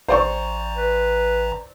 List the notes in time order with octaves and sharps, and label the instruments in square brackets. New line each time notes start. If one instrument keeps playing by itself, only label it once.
[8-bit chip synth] A1 A#5 [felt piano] C5 D5 C#6
[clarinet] B4